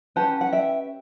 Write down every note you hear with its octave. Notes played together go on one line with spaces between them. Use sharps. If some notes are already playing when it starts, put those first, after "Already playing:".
C#4 G4 B4 F#5 A5
F#5
E5 G5